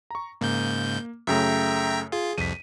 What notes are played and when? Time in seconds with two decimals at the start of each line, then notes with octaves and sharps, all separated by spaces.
0.10 A#5 C#6
0.41 G#2 C#3 A#3 G6
1.27 F#2 C#3 A3 E5 G5 A#5
2.12 F4 G#4
2.38 C2 F2 B6 D#7